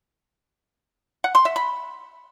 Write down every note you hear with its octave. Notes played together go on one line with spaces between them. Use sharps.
F#5
C6
E5
B5